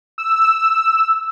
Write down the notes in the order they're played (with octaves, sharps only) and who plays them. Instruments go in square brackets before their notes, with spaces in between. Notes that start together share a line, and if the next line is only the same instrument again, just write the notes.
[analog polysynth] E6